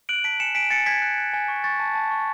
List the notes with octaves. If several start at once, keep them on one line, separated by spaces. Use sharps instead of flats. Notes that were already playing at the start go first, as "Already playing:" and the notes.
F#6 D7 F#7
A5 B6 D7
G#5 C#7 E7
G#5 B6 D7
G#5 A6 C#7
G#5 G#6 B6
F#6
F#6
G#5
C#6
C#6 A6
A5
A5
C#6